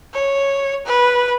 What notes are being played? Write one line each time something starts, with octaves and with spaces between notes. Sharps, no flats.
C#5
B4